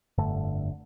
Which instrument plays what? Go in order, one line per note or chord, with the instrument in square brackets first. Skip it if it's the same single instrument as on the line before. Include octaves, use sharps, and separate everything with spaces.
[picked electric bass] F1 G2 D3 A3